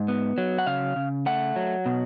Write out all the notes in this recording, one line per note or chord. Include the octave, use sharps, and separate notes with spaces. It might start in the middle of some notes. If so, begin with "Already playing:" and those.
Already playing: G#2
B3
F#3
F#5
C#3 F5
C#3
A3 F#5
F#3
B2